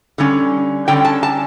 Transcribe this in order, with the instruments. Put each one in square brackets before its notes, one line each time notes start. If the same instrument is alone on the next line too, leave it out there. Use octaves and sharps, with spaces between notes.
[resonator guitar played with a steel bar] D3 G3 C#4
D3 G3 C#4 G5
A5
A5